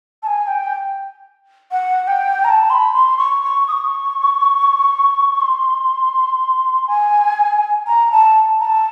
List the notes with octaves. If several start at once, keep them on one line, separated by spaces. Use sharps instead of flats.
A5
G#5
G5
F#5
G5
A#5
A5
C6
B5
C6
C#6
C#6
D#6
C#6
C6
G#5
A#5
A5
A#5
A5